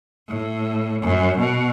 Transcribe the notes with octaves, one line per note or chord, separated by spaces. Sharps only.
A2
F#2
B2